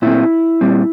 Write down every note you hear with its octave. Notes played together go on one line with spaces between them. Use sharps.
A#2 A3 C4 E4
A#2 G3 C4